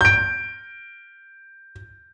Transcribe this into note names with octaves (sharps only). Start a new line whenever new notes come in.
G6 D7